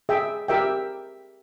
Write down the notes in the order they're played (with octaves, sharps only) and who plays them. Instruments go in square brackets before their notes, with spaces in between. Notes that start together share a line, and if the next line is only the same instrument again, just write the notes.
[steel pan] G#4 E5 G5
G4 A#4 E5 G5